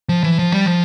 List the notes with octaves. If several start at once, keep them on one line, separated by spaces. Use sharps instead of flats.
F3
E3
F3
G3
F3